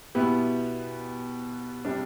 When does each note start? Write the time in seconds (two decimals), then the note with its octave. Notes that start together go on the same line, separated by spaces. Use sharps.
0.15 B2 B3 E4 G4
1.85 C3 G3 D4